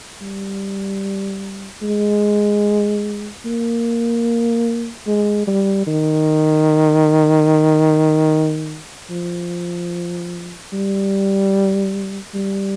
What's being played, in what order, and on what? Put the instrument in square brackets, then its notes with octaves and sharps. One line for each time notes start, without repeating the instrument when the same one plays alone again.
[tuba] G3
G#3
A#3
G#3
G3
D#3
F3
G3
G3